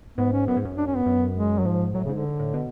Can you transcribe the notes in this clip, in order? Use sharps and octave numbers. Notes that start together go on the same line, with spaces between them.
G#2 B3
C#4
F#2 B3
G#2
F#2
D4
C#4
B3
F#2
G#3
F#3
G#2 F3
A2 F#3
C#3
G#2
D3
A2
B2